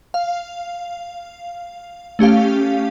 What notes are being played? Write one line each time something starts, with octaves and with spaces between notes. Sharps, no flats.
F5
A3 C#4 G4 F5